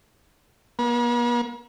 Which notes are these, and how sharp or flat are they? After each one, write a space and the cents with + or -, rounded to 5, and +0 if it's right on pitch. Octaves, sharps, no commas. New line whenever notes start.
B3 -45